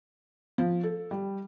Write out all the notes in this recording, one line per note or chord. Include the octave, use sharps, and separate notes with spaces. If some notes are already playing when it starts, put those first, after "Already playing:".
F3
A4
G3